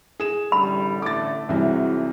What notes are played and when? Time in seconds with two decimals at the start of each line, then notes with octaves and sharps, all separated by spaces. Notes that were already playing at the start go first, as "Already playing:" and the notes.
0.20 G#4 E7
0.52 A1 D3 G3 B5
1.02 A1 D3 A3 D6 A6
1.49 C2 G#2 C3 E3 F#3